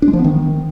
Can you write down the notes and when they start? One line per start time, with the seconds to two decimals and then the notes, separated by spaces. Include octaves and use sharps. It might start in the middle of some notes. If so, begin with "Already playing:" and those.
0.02 D4
0.08 G#3
0.13 F3
0.19 B3
0.24 D#3